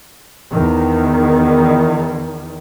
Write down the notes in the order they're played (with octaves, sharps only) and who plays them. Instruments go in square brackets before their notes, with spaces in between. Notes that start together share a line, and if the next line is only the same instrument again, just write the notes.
[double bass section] E2 D#3